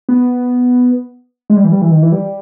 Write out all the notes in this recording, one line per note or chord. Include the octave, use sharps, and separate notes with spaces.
B3
G#3
G3
E3
G3
E3
D#3
E3
G3